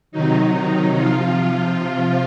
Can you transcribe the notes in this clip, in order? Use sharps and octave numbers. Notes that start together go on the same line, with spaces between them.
C3 D#3 F#3 D#4
C3 F3 F4